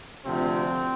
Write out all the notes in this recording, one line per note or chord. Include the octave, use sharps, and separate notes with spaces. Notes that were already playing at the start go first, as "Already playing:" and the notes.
D2 C3 F3 C4